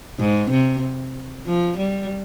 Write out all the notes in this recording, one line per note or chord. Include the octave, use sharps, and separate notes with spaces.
G#2
C3
F3
G3